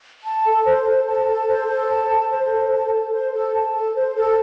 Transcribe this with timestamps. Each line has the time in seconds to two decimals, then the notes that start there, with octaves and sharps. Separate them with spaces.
0.24 A5
0.45 A4
0.66 C5
0.87 A4
1.07 A5
1.27 A4
1.48 C5
1.68 A4
1.89 A5
2.10 A4
2.30 C5
2.51 A4
2.71 A5
2.92 A4
3.12 C5
3.33 A4
3.54 A5
3.74 A4
3.95 C5
4.16 A4